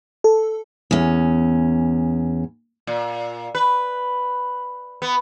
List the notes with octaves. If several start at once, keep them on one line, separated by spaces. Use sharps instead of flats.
A4
E2 C#4
A#2
B4
B3